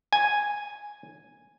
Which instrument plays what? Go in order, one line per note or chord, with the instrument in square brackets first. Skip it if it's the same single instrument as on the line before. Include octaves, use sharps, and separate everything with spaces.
[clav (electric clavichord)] G#5